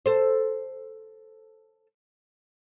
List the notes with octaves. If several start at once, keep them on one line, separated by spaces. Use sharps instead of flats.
A4 C5